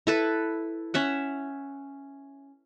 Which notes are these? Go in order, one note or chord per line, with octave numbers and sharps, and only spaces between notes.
E4 A4 B4
C#4 E5 F#5